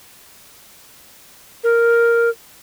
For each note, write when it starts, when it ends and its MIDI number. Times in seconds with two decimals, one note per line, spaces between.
1.64 2.29 70